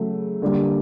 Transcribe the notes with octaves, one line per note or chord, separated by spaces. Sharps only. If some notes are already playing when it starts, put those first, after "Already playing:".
Already playing: C#3 F#3 A3
D3 G3 A#3